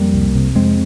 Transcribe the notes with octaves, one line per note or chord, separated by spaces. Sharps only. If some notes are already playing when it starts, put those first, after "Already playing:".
Already playing: F2 G3 A#3
C2
C3
F2 G#3 C4